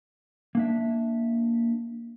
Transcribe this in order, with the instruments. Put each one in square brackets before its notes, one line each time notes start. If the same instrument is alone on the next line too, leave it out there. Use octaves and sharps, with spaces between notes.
[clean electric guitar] A#3 D4 E5